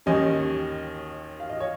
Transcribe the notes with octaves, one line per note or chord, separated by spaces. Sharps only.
D#2 D#3 G3 C#4 D#5
F5
D#5
C#5